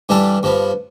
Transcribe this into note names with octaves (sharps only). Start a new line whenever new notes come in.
G2 E3 G3 D4 A4
G2 F3 B3